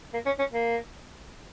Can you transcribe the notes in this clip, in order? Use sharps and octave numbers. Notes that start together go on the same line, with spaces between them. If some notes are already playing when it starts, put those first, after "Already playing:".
A#3
C#4
C#4
A#3